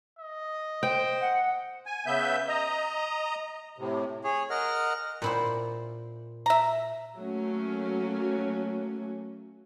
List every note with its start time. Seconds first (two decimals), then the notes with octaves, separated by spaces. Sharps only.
0.19 D#5
0.83 C5 G5
1.21 F#5
1.86 G#5
2.06 C#3 B3 E5 G6
2.48 D#5 A#5
3.78 A2 C3
4.24 G#4 C#5
4.50 A#4 D#5 F#5 F6
5.22 A#2 E4 C5
6.46 E5 A#5
7.17 F#3 A3 A#3 C#4